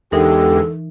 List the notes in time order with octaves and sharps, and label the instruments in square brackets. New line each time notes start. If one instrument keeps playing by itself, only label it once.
[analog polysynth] E2 D3 G#3 [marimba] E3 D#4 A#4 [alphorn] G4 [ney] A4